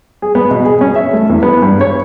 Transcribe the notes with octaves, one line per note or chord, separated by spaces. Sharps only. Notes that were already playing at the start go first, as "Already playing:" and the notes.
G#4
B3
B2
G#4
C#4
E5
A3
E2
B3
G2
C#5